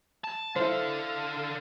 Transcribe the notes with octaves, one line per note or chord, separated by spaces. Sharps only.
A5
D3 E4 A4 C5 F5